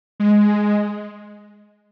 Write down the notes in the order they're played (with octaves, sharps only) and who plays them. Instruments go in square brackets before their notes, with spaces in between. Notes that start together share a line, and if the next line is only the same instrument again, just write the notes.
[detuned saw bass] G#3